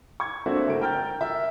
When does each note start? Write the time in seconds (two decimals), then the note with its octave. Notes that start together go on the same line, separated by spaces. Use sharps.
0.20 C#6 G#6
0.46 A3 A#3 C4 D4 F#4 E5
0.67 F#1 A3 D7
0.81 A#4 G5 A#5 F6 G6 A6
1.20 A#4 E5